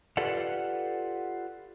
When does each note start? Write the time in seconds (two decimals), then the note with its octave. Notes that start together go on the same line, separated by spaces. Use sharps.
0.17 F4 G4 A4 B4 D5 F#5